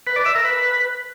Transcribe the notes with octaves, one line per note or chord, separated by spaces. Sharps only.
B4
D5
E5
A#4
B4